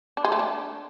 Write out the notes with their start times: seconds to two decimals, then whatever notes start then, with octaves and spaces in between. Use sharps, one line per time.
0.17 D4
0.25 G#3
0.32 A3
0.39 D4